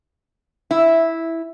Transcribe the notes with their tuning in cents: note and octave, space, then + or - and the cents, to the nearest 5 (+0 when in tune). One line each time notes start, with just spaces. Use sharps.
E4 -5